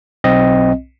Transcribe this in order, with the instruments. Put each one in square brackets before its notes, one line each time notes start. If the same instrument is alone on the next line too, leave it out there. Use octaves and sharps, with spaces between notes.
[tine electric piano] B1 C4 D#5